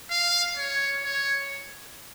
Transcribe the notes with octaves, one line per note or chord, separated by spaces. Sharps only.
F5
C#5
C#5